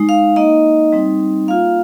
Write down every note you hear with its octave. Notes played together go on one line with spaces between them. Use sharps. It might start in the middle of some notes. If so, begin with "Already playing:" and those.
Already playing: G#3 D#4
F5
A#3 D#4 D#5
G3 C4 D#4
A#3 F4 F5